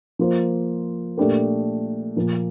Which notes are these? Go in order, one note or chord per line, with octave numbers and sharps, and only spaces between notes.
F3 A#3 F4 C5
A#2 A3 D4 G4 A#4
A#2 F3 A#3